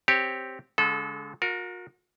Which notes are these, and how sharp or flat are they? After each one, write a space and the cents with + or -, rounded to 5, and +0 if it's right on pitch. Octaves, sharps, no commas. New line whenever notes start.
C4 +0 G4 +0 C#5 +0
D3 -45 G#3 +0 A4 -25
F#4 -45 A#4 +0